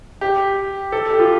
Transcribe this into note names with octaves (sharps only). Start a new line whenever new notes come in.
G4
A4
G4
F4